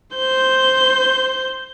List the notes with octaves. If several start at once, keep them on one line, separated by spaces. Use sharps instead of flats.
C5 G6